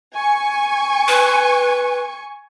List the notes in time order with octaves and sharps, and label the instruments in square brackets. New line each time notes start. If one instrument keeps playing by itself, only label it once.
[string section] G#5 C#6
[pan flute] B4